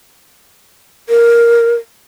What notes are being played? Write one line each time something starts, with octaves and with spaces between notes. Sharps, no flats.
A#4